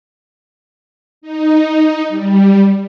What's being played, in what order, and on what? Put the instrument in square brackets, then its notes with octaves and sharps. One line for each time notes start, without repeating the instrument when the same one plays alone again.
[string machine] D#4
G3